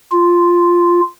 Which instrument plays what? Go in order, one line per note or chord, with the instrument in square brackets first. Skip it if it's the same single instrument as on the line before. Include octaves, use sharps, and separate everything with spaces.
[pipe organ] F4